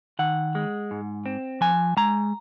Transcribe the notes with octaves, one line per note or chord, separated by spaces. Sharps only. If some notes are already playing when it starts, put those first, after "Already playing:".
D#3 F#5
G#3
G#2
C4
F3 G#5
G#3 A#5